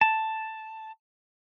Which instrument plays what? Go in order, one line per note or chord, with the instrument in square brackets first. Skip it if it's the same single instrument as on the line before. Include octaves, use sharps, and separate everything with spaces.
[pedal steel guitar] A5